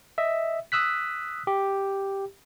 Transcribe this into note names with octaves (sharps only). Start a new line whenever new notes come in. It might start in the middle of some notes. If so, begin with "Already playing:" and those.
D#5 E5
D#6 E6 F#6 B6
G4